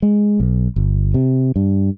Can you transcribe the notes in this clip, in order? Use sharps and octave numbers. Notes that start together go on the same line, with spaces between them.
G#3
B1
G1
C3
G2